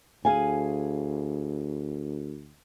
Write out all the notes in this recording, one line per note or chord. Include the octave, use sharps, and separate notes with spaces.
D2 G#4 F5 G#5